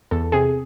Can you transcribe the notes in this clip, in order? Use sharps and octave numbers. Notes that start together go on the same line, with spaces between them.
E2 A4
C3 G#4